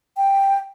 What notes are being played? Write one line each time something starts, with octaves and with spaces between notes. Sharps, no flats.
G5